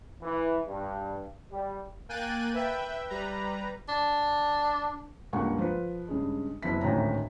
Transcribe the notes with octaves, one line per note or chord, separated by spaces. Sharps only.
E3
G2
G3
A#3 G5 G#5 F#6 A6 D#7
B4 E5 G5
G3 B4 A#5
D4
C#2 G2 A#3 F#5 G#5 C#6
F3 B4
G2 C#3 G#3
F#1 B3 E4 B6
G#1 D2 A2 D#3 C#4 A#5